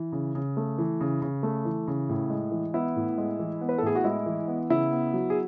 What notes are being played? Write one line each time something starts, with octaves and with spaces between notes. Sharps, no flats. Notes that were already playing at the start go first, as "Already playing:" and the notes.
Already playing: E3
C#3
C#3
A3
E3
C#3
C#3
A3
E3
C#3
A2
G#3
E3
B3 E4
A2
G#3
E3
B3
B4
A4
A2 G#4
F#4
G#3 E4
E3
B3
C#3 E4
B3
F#3
G#4